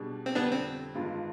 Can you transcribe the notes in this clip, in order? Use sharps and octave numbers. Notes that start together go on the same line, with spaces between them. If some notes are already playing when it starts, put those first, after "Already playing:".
Already playing: B2 G3 D4 G#4
C4
F2 D3 G3 B3 D4
C4
G2 D#3 G#3 D4 F4